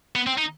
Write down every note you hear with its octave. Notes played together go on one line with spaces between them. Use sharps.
B3
C4
D#4